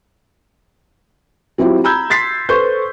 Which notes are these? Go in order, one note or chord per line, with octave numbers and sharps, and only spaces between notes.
F#3 C4 E4 F4 G4
A#5 B5 E6 G6 G#6
C6 A6 B6 C7
A4 B4 C5 C6 C#6 G6